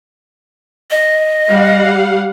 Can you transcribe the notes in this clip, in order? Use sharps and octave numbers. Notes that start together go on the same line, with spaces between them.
D#5
G3 F5 F#5